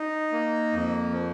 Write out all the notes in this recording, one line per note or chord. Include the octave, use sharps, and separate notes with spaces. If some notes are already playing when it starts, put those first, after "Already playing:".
Already playing: D#4
A#3
F2
F3